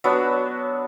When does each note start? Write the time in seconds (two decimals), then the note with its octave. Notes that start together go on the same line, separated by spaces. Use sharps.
0.04 F#3 B3 D4 E6